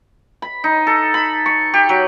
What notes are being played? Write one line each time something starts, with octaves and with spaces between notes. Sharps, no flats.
B5
D#4
A4
B5
C#6
G4
F#3